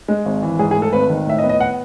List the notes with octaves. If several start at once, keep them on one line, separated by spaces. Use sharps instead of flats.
G#3
G#1
E3
G#2 G#4
G#4
A3
A4
G#1 B4
D#3
A2 E5
D#5
B3
D#5
F#5